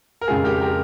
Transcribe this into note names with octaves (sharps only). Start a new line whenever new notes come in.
A#4
F2 C#3 G#3 F4 G#4
G4 A#4
G4 A#4